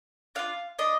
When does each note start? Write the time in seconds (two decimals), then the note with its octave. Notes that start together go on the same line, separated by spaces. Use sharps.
0.35 D4 F4 F5
0.79 D4 D#5